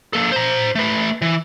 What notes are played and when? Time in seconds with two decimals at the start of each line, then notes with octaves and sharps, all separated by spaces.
0.13 A#3 A4
0.32 C5 A#5
0.75 A3 B4
1.22 E3